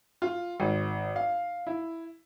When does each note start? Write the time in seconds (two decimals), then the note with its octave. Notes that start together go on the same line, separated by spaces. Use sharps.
0.22 F4
0.60 G#1
1.16 F5
1.67 E4